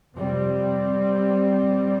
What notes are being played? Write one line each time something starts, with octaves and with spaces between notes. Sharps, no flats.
F1 F2 C3 G3 C4
A#1 A#2